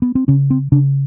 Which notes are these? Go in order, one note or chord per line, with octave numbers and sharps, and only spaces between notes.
B3
C4
C#3 C#4
C4
C#3 D4